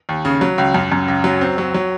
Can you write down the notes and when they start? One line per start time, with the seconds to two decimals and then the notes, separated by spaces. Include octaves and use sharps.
0.09 D#2
0.25 C#3
0.41 F#3
0.58 C#2
0.74 F#2
0.92 F#2
1.08 C#2
1.24 F#3
1.41 C4
1.58 F#3
1.74 F#3